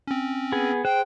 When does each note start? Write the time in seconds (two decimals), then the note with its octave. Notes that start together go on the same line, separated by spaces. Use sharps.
0.07 C4 C#4
0.52 B3 G#4
0.85 G#4 C5 G5 F#6